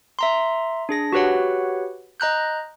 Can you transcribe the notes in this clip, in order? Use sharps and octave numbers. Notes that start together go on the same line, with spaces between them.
E5 A#5 C6
D4 G#4 A#6
F#4 G4 B4 C#5 F#5
D#5 A#5 F#6 G6